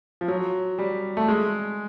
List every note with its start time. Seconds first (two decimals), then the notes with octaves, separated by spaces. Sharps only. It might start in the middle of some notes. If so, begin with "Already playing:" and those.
0.21 F3
0.28 F#3
0.78 G3
1.17 A3
1.28 G#3